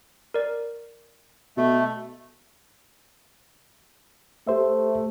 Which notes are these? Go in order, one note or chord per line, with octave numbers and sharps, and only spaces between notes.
A#4 D5
B2 A3
A3 G4 C5 E5